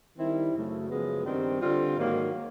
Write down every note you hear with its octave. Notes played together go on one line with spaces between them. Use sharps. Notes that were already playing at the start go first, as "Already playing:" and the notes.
D#3 G3 C4 E4
F#2 C#3 F#3 A3
F#2 C#3 F3 G#3 B3
G2 D#3 G3 C4
D3 G3 C4 F4
G#2 D#3 F#3 A#3